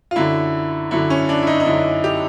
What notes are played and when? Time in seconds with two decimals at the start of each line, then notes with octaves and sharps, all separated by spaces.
0.11 F4
0.16 F#2 D3 F#3 E4
0.91 F#2 D3 F#3 E4
1.10 C#4
1.29 D4
1.43 E4
1.47 D#4
1.60 D#4
1.66 F#2 D3 F#3 E4
2.04 G4